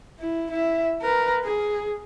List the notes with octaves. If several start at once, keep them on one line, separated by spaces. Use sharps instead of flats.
E4
E4 E5
A#4 B4
G#4